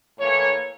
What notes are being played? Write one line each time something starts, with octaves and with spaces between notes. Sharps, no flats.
A2 E3 A#3 C#5